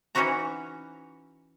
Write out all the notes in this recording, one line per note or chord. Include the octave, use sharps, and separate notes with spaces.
E3 C#4 D#4 E4 F#4 A#5